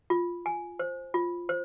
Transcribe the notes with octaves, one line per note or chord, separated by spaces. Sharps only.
F4
G#5
C5
F4
C5